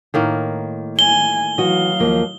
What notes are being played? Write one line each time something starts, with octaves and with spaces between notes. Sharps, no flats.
A2 D#3 A#3
G#5 G7
E3 F#3 F#4 D#5 F5
D#2 F3 A#3